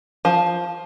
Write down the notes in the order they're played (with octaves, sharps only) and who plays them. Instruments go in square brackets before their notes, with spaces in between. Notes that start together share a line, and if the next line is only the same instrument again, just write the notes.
[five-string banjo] F3